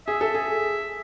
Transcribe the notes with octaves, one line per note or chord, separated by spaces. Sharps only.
G#4 E5
A4
G#4